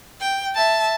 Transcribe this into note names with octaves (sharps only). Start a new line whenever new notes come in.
G5
E5 A5